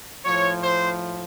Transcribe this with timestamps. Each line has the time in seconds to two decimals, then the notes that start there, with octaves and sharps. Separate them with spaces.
0.25 A2 F3 C#5
0.62 C5